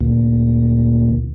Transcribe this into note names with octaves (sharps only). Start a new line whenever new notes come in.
D2 A#2